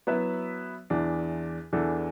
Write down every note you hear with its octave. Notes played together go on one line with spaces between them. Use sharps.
F#3 B3 E4 B4 E5
E2 E3 D4
E2 E3 D4 A4